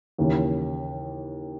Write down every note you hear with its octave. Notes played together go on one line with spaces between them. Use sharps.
D#2 C#3 E3